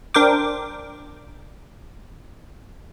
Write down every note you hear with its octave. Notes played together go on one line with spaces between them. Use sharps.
D4 A#4 C5 G5 D6